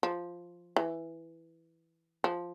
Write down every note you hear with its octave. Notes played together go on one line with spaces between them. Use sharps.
F3
E3
F3